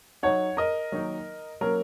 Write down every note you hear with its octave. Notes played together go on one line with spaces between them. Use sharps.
F#3 D#4 C#5 F#5
A#4 D#5
D#3 F#3 A#3 D#4
F#3 A#3 C#4 A#4